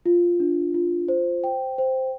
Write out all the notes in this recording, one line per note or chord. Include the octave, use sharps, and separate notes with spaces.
F4
D4
F4
C5
G5
C5